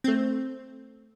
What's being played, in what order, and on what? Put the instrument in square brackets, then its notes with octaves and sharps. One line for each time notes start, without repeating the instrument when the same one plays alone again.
[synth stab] A3 C4